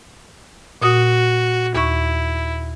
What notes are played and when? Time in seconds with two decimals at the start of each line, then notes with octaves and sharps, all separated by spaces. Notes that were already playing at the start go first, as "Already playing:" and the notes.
0.82 A#2 F#4 D#6
1.75 D#2 E4 C#6